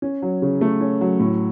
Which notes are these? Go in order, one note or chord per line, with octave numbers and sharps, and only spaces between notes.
C#4
F#3
C#3
A3
C#4
F#3
A2